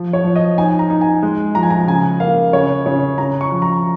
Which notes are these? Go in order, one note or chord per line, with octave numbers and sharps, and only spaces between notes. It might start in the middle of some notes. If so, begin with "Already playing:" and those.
Already playing: F3
C#5
F3
D#5
D#4 G#5
A#5
D#4
G#5
G#3
F3 A#5
G#5
A#5
C#3 G#5
A#3 F5
C#3 C#5
C#3 C#5
C#3 A#5
C#6
F3
A#5